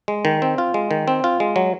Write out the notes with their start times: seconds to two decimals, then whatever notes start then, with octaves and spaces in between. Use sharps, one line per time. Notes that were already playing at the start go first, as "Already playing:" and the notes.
0.08 G#3
0.25 D#3
0.42 C4
0.58 F4
0.74 G#3
0.91 D#3
1.08 C4
1.24 F4
1.40 G#3
1.56 F#3